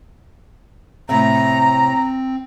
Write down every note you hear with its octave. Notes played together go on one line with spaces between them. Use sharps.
A2 C3 C4 E5 A#5